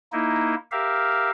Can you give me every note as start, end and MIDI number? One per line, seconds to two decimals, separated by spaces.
0.12 0.55 58
0.12 0.55 63
0.12 0.55 64
0.71 1.31 67
0.71 1.31 70
0.71 1.31 76
0.71 1.31 77